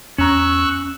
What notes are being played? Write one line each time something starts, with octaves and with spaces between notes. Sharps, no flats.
E2 C#4 A#5 C#6 E6 F#6